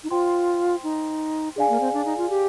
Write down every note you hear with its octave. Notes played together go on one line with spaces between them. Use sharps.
D#4
F4 C5 G5 C6
D#4
D4 G#4 D5 F5 G#5
A#3
C4
D4
D#4
F4
G4